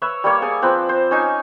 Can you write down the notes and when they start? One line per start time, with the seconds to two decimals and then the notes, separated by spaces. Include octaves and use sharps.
0.02 B4 C#5 E5
0.24 G3 A#3 C#5
0.42 G#4 D5 G#5
0.62 F3 C4 B4 G5
0.89 C5
1.11 C#4 D#4 G#5